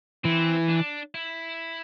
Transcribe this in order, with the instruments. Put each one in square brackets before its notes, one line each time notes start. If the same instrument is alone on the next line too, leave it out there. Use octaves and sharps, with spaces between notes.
[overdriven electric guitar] E3 [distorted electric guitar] C4
[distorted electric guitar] D4
E4